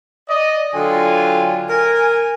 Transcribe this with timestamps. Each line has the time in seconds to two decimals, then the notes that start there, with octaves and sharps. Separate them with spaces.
0.30 D5 D#5
0.74 D3 F#3 F4 G5 G#5
1.70 A#4 G#5